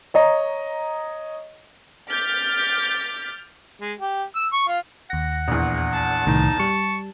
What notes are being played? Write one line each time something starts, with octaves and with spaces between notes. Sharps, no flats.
C#5 D#5 A#5
D6 F6 G6 A6 B6
G#3
G4
E6
C#6
F4
D#2 F#5 A#6
A#1 E2
A5
C2 A2 D#3 D#4
G3 C#6